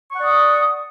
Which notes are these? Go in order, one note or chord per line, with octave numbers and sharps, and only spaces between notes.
D5 F#5 C#6 D#6